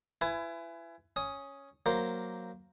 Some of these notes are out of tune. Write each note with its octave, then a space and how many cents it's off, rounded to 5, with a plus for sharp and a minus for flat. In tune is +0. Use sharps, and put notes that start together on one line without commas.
E4 +30 B4 +25 G#5 +0
C#4 +0 D#6 +10
F#3 +0 A#3 +0 C5 +0